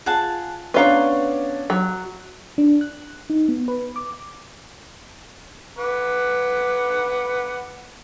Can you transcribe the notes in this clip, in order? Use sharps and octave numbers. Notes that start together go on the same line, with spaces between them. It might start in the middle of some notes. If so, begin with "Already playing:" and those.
F4 G#4 F#5 A5
B3 C#4 D4 B4 C#5 F5 A#5 C6
F#3
D4
F#6
D#4
B3
B4
D6
B4 F#5 D6